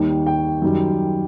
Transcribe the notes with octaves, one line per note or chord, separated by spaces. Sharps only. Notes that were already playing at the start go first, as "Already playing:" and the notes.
Already playing: D#2 D#3 G3
G5
F#2 D#3 G3